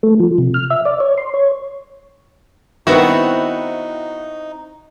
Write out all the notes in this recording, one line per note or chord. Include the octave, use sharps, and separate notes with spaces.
A3
F3
C3
F6
E5
D5
C#5
C6
C#5
D#3 B3 C4 D#4 E4 F#4